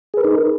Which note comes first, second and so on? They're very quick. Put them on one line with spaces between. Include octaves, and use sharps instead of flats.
G#4 B4 A#4 D#4